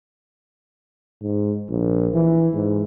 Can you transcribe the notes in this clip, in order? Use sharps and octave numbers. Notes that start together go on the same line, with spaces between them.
G#2
A#1
E3
G#2